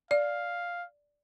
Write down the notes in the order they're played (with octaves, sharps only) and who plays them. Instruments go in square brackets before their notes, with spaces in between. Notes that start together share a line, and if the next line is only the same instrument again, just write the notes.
[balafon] D5 [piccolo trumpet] F5